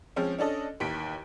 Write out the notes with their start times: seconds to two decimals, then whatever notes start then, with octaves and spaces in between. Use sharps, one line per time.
0.16 F3 G#3 C4 C#4
0.39 C#4 D4 A4 D#5
0.80 A1 D#2 B6 D7